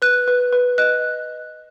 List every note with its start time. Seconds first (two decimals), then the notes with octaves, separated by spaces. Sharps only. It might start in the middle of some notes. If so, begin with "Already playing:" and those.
0.02 B4 F#6
0.28 B4
0.53 B4
0.78 D#5 F#6